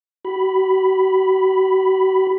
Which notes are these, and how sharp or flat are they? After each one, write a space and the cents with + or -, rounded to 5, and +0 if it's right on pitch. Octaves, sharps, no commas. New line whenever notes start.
F#4 +40 B5 +0